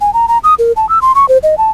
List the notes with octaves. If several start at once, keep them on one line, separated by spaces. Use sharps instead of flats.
G#5
A#5
A#5
D#6
A#4
A5
E6
C6
C#6
C5
D#5
A5